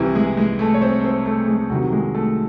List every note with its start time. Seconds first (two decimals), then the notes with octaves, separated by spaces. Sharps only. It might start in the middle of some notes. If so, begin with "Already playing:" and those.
Already playing: C2 C3 E3 E4
0.15 G#3 G#4
0.37 G#3 G#4
0.59 A3 A4
0.74 C#5
0.82 C4 C5
1.04 C4 C5
1.26 A3 A4
1.47 G#3 G#4
1.70 C2 C3 D#3 F#3 F#4
1.92 G#3 G#4
2.14 A3 A4